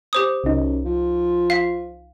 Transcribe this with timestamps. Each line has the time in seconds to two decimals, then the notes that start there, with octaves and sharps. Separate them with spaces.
0.13 G4 C5 D#6
0.44 C2 F#2 D#4
0.85 F3
1.50 F5 B6